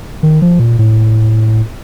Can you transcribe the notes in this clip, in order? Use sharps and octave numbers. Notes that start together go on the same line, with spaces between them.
D#3
F3
A#2
A2